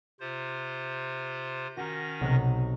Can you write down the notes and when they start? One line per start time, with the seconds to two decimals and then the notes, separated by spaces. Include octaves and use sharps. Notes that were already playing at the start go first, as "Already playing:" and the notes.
0.20 C3 F4 C5
1.77 D#3 C#4 F#4 A#4 A#6
2.21 B1 C3 F#6